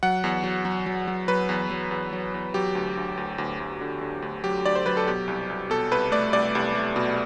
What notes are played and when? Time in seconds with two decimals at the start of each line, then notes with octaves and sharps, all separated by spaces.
0.03 F#3 F#5
0.24 E2
0.44 F#3
0.65 F#3
0.86 F#3
1.08 F#3
1.28 F#3 B4
1.49 E2
1.70 F#3
1.91 E2
2.13 F#3
2.34 E2
2.54 F#3 G4
2.75 D2
2.97 D2
3.17 D2
3.38 D2
3.60 D2
3.81 D3
4.01 D3
4.22 D2
4.44 F#3 G4
4.65 D2 D5
4.75 C5
4.86 F#3 B4
4.97 A4
5.07 B2 G4
5.28 C2
5.50 C2
5.70 B2 A4
5.91 C2 B4
6.12 A3 D5
6.33 C2 D5
6.55 C2
6.75 A3
6.96 B2